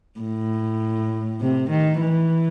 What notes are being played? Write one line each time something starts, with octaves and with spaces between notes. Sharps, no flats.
A2
C3
D#3
E3